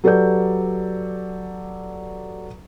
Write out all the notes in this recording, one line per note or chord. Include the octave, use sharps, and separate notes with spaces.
F#3 G4 A4 B4 D5 G6